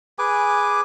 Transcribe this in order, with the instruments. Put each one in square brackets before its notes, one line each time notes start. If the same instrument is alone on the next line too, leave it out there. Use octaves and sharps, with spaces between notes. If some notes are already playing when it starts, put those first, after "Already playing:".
[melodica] G#4 B4 G#5 D6